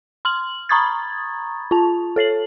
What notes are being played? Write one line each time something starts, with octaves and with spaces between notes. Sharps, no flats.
C6 F6 F#7
A#5 B5 C#6 D#6 G#6 A6
F4 A5
A4 C#5 C7 F#7